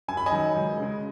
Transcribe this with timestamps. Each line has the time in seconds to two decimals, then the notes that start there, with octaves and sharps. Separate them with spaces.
0.08 F#2 G#5
0.17 B5
0.26 D#5 G#5
0.32 D#3 F#3
0.56 C#2
0.80 C#3 G#3